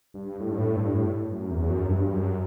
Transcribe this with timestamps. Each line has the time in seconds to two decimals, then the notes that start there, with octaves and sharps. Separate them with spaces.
0.14 G2
0.40 A2
0.51 G2
0.58 A2
0.76 G2
0.95 A2
1.32 F#2
1.51 E2
1.70 F#2
1.89 G2
2.13 F#2